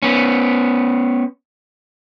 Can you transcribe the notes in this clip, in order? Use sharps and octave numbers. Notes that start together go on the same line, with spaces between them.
B3 C#4